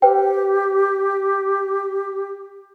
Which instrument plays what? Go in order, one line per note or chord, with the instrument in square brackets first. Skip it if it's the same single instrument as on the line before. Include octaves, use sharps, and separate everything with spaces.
[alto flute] G4 [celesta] B4 C5 G5